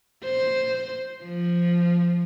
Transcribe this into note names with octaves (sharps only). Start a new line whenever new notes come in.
C5
F3